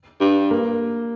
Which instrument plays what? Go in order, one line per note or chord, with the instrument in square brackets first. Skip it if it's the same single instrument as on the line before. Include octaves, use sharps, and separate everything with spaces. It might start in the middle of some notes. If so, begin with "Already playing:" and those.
[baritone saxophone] G2
[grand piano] A#3